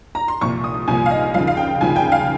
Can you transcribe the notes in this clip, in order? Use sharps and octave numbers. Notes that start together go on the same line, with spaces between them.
A#5
C6
C2 A#2 F3 C#6
D#6
C2 A#2 F3 G#5
F5
D#5
D#2 C#3 F3 F5
F5
G5
D#2 C#3 F3 G#5
G5
F5